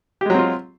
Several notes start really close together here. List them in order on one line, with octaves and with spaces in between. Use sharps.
G4 G#3 F#3 C4 F4